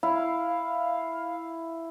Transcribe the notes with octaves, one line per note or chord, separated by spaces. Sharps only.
E4 F5